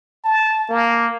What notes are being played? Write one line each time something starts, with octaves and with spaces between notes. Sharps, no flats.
A5
A#3